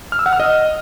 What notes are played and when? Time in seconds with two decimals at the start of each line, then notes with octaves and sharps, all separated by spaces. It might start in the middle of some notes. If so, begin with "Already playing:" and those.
0.12 F6
0.19 E6
0.26 F#5
0.33 F6
0.40 D#5